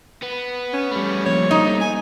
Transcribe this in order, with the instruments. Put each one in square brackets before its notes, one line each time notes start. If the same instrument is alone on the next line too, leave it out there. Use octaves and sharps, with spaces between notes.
[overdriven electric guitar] B3
[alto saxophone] C#4
[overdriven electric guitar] G3 A3
[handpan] F3 A#3 [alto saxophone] C#5
[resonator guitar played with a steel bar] D#4
[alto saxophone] G#5